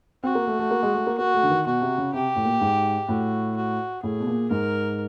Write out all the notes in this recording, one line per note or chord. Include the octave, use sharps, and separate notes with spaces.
C4 F#4
A#3
A3
A3
A#3
G#3
A3
A#3
A#3 F#4
A3
D3
D#3
B2 F#4
C3
C#3
C3 G4
A2
A#2
G#2
A2 F#4
F#4
A2 G#4
B2
A#2
G#2 A#4